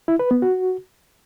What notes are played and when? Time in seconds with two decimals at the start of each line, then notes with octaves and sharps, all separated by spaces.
0.08 E4
0.19 B4
0.31 B3
0.42 F#4